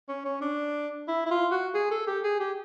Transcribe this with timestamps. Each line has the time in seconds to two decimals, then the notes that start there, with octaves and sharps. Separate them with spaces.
0.09 C#4
0.25 C#4
0.41 D4
1.08 E4
1.26 E4
1.31 F4
1.52 F#4
1.74 G#4
1.91 A4
2.07 G4
2.24 G#4
2.40 G4